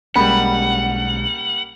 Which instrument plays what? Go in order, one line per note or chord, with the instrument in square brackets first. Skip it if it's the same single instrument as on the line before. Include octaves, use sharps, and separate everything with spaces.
[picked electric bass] B1 G#3 C#4 [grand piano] G3 A#3 [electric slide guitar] F#5 [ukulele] B5